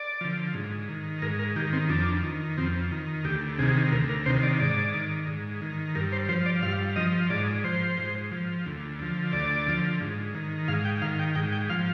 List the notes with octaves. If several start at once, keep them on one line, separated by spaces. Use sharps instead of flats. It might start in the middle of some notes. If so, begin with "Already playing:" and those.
Already playing: D5
D3 F3
G#2
D#3
G#2 A#4
A#4
D#3 G4
C4
F2 D4
D#3
F2 C4
D#3
D2 G4
C3 D#3 G#4
D2 A#4
A#4
C3 D#3 C5
D5
G#2 D5
D#3
G#2
D#3
G2 A#4
C5
F3 C5
D5
G2 F5
F3 D#5
G#2 D5
F3 C5
G#2
F3
D2
D3 F3
D2 D5
D3 F3
G#2
D#3
G#2 F5
G5
D#3 F5
G5
G#2 G5
G5
F3 F5